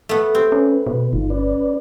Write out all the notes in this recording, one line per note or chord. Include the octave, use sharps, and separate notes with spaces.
A3 B3
C4 G4
C#4 B4
B2
G1 D#4 F4
C#4 B4 D5